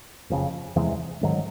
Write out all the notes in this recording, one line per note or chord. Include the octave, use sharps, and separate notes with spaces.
F#1 F2 C#3
E2 C3 E3 G#3
A1 G#2 D#3 F#3